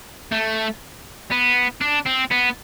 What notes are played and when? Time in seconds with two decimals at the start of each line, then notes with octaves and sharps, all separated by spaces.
0.32 A3
1.32 B3
1.81 D4
2.06 C4
2.31 B3